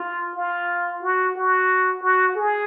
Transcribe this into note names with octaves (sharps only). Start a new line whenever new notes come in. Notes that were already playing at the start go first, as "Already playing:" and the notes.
Already playing: F4
F4
F#4
F#4
F#4
G#4